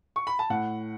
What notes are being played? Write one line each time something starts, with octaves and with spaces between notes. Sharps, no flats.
C#6
B5
A5
A2 F#5